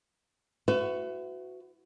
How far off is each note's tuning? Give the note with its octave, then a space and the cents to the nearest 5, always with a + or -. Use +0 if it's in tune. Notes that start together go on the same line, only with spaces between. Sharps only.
F#4 +0 B4 +35 E5 +20